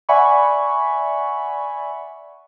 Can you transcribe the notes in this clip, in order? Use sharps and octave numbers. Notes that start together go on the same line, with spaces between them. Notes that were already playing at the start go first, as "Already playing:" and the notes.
D5 E5 F#5 G#5 B5 C#6